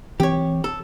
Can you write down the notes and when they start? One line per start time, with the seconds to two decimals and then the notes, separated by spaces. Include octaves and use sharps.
0.20 E3 C4 G4 C#5
0.64 A4